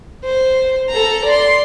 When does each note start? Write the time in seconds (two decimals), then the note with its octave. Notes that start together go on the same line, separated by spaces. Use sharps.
0.25 C5
0.90 A4 A#5
1.26 D5 C6